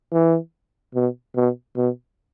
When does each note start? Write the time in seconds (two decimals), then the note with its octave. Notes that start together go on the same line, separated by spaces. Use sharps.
0.13 E3
0.95 B2
1.36 B2
1.76 B2